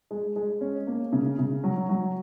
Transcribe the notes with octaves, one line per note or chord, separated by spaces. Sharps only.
G#3
G#3
C#4
A#3
C#3
C#3
F#3
F#3